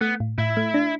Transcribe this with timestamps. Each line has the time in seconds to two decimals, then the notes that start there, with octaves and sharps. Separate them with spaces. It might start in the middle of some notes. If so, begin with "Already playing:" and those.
0.01 A3 B3
0.20 A2
0.38 A2 E4
0.57 A3
0.74 D4